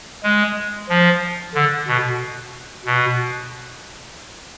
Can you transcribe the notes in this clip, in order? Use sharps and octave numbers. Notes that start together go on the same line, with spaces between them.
G#3
F3
D3
B2
B2